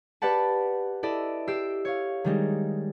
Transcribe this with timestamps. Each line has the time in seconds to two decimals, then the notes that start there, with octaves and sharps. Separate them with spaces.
0.22 G4 B4 D5 F#5 A5
1.03 E4 A4 D5 D#5
1.48 G4 E6 C7 D7
1.85 C#5 F5
2.24 D#3 G3 G#3 D#4